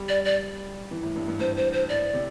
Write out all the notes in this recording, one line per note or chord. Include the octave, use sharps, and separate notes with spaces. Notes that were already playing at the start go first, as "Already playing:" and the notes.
Already playing: G3
D5
D5
E3
A2
G2
G2
G2 C5
C5
C5
A2 D5
C3